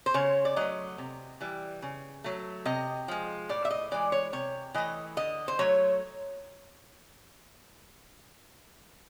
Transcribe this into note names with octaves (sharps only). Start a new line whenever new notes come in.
C5
C#3 C#5
D5
F#3 A3 D#5
C3
E3 G3
C#3
F#3 A3
C3 D#5
F3 G#3
A2 D5
E5
D#5
E3 G#3 D5
C#5
C3 C#5
E3 A3 D#5
D3 D#5
C5
F#3 A3 C#5